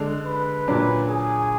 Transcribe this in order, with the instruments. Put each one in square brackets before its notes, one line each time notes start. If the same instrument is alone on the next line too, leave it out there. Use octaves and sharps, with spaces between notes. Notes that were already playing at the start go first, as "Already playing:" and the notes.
Already playing: [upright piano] D3 G#3 D4
[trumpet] B4
[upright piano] A#2 F#3 D4
[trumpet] G#4